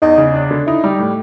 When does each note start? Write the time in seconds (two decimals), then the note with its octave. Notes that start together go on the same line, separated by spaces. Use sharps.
0.02 E2 D#4
0.18 C#3
0.34 D4
0.51 D3
0.67 D#4 E4
0.84 G3
0.99 A2